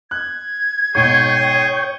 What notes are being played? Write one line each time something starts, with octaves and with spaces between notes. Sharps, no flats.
F#6 G#6
G#2 B2 G#4 C#5 G5